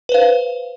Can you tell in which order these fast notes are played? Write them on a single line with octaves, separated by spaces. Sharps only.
B4 C5 F5